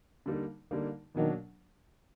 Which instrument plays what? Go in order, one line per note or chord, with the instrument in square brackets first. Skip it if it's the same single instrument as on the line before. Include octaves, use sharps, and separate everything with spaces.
[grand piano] D3 G3 A#3 D#4
D3 G3 A#3 D#4
[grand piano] B2 F#3 A#3 D4 [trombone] D#3